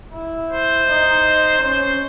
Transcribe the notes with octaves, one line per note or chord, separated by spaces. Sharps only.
E4
C5
D#4
C#4 C5